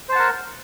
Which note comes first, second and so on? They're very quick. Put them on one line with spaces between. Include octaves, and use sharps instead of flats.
C5 A5 F#5 A#4